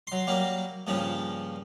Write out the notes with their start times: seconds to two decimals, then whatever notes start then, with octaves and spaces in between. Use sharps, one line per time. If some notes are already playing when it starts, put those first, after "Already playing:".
0.07 F#3 C6
0.27 F#3 G3 A#3
0.87 G2 A#2 C#3 F3